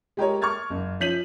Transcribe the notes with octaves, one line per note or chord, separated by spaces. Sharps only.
G#3 G4 A#4 C#5
C#6 D6 F6 G#6 A6
F#1
F3 C#4 G6 B6 D#7 F#7